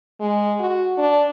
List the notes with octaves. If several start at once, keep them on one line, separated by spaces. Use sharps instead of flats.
G#3
F#4
D4